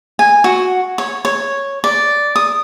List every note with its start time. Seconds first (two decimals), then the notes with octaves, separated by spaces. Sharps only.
0.19 G#5
0.44 F#4
0.98 C#5
1.25 C#5
1.84 D5
2.36 D#6